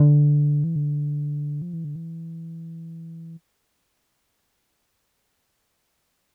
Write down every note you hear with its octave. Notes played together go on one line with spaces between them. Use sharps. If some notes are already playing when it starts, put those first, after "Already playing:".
Already playing: D3
E3
D3
F3
E3
D3
E3